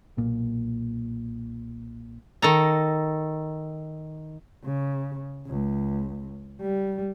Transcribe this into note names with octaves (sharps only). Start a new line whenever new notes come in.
B1 A#2
D#3 A4 A#5
C#3
C#2
G3